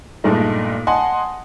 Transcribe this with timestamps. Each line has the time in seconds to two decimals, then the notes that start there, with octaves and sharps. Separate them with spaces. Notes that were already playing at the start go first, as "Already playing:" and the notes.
0.24 G2 A#2 G#3 A3 D#4
0.87 D#5 F#5 G#5 A5 C6